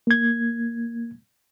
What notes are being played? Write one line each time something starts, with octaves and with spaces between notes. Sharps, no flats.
A#3 G#6